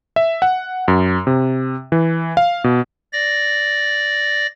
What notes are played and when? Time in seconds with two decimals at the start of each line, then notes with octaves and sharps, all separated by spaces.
0.16 E5
0.42 F#5
0.88 F#2
1.27 C3
1.92 E3
2.37 F5
2.64 B2
3.13 D5 A#6